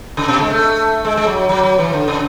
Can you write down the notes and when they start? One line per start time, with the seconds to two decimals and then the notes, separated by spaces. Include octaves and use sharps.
0.17 C#3
0.28 B2
0.39 G#3
0.50 A3
1.05 G#3
1.17 G#3
1.27 F#3
1.49 F#3
1.63 F#3
1.78 E3
1.93 D3
2.08 C#3